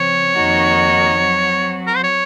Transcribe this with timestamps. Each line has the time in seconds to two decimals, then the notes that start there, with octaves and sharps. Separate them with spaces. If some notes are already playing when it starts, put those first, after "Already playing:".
Already playing: C#3 F3 C4 C#5
0.35 F2 D#3 A#3 D#4 F#4
1.19 F#3 C4 F#4
1.87 A#4
1.96 C5
2.03 C#5